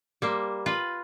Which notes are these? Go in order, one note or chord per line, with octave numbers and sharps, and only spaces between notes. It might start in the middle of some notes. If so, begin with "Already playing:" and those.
G3 A#3 C5
F4 B4